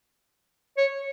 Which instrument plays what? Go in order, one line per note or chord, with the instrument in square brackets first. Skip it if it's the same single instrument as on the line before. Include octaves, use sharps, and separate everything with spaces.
[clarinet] C#5